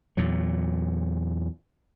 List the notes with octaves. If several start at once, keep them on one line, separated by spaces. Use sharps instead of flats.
E2 A#2 F#3